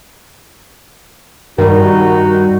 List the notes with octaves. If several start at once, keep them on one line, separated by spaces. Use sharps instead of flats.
G2 D#3 G3 D#4 F#4